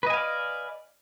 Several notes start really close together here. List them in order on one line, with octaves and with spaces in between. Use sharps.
B4 D#5 G#5 F5 D5